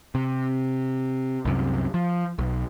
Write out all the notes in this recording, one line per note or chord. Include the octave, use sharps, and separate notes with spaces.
C3
C2 F#2 C3
F3
B1